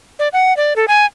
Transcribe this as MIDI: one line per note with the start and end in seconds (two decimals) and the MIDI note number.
0.19 0.28 74
0.33 0.56 78
0.57 0.74 74
0.76 0.86 69
0.88 1.06 80